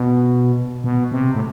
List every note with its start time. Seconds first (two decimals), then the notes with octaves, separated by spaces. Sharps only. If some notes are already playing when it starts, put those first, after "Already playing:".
Already playing: B2
0.84 B2
1.11 C3
1.35 A2